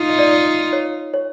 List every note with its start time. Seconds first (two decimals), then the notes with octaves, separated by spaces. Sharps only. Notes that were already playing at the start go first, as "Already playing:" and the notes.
Already playing: D#4 F4
0.10 D#5
0.19 D5
0.73 C#5
1.14 C#5